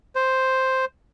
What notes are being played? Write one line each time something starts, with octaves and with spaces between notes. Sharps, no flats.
C5